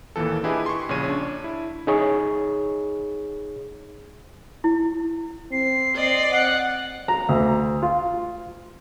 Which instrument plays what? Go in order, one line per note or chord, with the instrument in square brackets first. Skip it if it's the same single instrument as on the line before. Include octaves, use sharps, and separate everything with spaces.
[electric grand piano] D#2 A#2 E3 A4
D4 E4 G4 G#4 B4 D#5
C6 C#6
A#1 C#3 C#5 D#7
D4
E4
[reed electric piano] D#4 G#4 C#5
[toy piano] E4
[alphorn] C4 [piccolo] C7
[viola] D5 D#5
[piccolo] F#5
[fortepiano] A#5
D2
F4